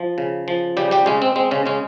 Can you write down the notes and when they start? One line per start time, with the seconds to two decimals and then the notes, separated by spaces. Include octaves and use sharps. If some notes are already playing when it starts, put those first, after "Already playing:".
Already playing: F3
0.18 C#3
0.48 F3
0.77 C#3 G3 G4
0.91 G3 G4
1.06 C#3 G#3 C#4
1.22 C4
1.36 G#3 C4
1.51 C#3 C#4
1.66 C#3 G#3 C#4